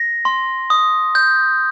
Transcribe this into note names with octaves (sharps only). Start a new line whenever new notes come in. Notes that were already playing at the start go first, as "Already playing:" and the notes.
Already playing: A#6
C6
D#6
G6